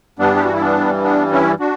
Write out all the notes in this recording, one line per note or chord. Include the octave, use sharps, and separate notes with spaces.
G2 E3 G3 B3 D4
G4
F#4
E4
B3 D4
B3 D4
C#4 E4
D4 F#4